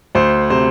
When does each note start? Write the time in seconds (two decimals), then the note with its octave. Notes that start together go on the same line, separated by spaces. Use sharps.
0.15 D2 C5
0.50 C3 C5